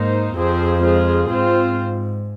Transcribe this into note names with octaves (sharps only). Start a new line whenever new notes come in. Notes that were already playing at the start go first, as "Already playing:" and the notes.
Already playing: G#2 A#3 D#4 C5
F2 F3 C4 G#4 C5
G#3 F4 G#4 C5
G#2 C4 F4 C5